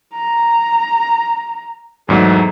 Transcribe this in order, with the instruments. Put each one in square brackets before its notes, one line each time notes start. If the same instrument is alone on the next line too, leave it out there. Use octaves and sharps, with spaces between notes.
[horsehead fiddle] A#5
[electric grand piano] E2 G#2 F#3 [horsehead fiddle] A3